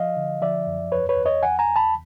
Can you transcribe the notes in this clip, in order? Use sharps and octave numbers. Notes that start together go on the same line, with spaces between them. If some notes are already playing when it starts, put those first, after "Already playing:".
Already playing: F3 D#5 F5
D3
F3 D5 E5
F#2
E2 B4 C#5
B4 C#5
E2
C#5 D#5
E2 F#5 G#5
G#5 A#5
E2
A5 B5